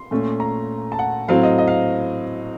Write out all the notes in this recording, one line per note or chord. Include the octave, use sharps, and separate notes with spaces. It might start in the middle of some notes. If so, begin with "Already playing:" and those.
Already playing: C6
A#2 A3 C#4
A#5
A5
F#5
A2 F#3 C4 F5
D#5
D#5
F5